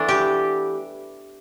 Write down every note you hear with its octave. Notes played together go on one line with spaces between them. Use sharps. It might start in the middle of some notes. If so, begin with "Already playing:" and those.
Already playing: E3 A3 B3 D4 B4
G4